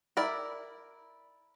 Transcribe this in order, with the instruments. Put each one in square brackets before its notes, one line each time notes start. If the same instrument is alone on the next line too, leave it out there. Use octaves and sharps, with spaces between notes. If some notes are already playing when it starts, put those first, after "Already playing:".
[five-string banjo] E4 A#4 D5